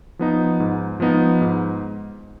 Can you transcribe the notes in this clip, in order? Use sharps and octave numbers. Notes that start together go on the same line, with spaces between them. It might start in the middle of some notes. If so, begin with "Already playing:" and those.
F3 B3 D#4
G#2
F3 B3 D#4
G#2